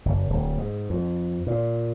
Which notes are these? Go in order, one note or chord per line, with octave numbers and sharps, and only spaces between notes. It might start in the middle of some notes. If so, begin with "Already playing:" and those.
F#1
D1
G#2
F2
A#2